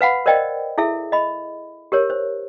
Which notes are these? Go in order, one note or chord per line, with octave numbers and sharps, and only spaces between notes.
B4 F5 F#5 B5
A#4 C5 D5 D#5 G5
E4 G#4 A4 E5
D#5 B5
G4 A#4 C#5
C5